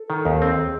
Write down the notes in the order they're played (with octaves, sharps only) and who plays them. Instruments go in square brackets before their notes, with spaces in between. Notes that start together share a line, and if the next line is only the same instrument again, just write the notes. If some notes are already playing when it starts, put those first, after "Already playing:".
Already playing: [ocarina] A4
[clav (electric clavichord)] D#3
D#2
C4
[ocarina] G#4